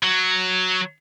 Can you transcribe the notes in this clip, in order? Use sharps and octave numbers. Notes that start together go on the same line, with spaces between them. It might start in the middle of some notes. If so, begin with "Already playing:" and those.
F#3